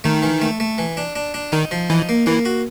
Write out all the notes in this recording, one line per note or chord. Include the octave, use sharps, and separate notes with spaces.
D#3 A3
E3
A3
A3
E3
D4
D4
D4
D#3 D#4
F3
E3 D#4
A#3
E3 A#3
F#4